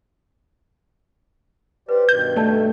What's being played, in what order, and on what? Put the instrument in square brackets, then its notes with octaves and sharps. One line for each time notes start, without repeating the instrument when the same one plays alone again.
[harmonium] G4 C5 D5 [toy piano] B4
[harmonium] G2 B2 D#3 [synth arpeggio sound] G6
[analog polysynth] A3 [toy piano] D5 A5